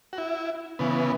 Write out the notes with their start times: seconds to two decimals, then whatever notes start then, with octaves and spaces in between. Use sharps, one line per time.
0.13 F#4
0.18 E4
0.79 C#3 E3 B3